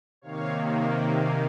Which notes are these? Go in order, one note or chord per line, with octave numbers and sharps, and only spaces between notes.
C3 D#3 A#3 C#5 F5
F5 G#5